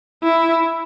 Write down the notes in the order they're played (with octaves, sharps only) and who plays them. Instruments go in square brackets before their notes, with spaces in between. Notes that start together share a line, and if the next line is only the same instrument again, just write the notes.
[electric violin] E4